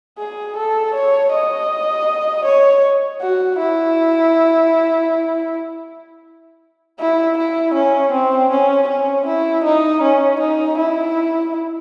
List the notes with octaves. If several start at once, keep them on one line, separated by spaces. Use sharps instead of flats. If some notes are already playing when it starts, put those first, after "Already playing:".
G#4
A4
C#5
D#5
C#5
F#4
E4
E4
E4
C#4
C4
C#4
C#4
E4
D#4
C#4
D#4
E4